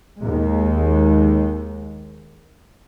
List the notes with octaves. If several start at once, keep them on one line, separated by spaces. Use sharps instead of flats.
D#2 G#3